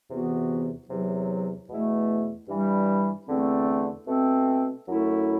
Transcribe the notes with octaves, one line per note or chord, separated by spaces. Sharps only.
E2 C3 E3 B3 F#4
E2 C3 F#3
E2 B2 A3 E4
G2 E3 G3
E2 D3 A3 C4
B2 A3 C4
F#2 F#3 A3 E4 A4